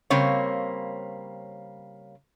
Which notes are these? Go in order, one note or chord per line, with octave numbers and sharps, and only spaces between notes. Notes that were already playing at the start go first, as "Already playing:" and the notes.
C#3 G3 A#3 C4 C#5